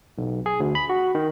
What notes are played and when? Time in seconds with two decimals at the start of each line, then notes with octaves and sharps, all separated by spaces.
0.18 B1
0.46 G#4
0.60 D2
0.75 B5
0.89 F#4
1.15 D#3